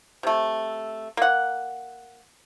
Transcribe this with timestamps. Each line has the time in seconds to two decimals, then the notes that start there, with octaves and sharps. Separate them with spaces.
0.23 C3 A3
1.17 A#3 F#5